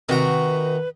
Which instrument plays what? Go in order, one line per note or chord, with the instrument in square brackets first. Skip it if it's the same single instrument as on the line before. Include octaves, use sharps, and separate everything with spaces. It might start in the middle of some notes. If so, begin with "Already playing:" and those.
[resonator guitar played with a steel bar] C3 F#4 [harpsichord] D#3 A#5 [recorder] B4